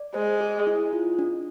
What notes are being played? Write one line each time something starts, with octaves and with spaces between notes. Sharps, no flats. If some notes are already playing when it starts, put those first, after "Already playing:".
Already playing: D5
G#3 C5
G#4
E4
F4
D4